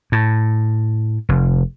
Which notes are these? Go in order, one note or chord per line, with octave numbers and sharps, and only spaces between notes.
A2
F1